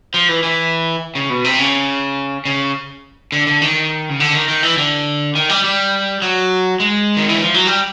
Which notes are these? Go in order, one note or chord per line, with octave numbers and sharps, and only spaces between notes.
F3
E3
E3
C#3
B2
C3
C#3
C#3
D3
D3
D#3
C#3
D3
D#3
D#3
E3
D3
D#3
G3
G3
F#3
G#3
D#3
E3
F3
F#3
G3